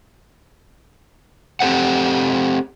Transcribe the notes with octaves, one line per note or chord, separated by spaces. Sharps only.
C4 G4 A4 C5 F#5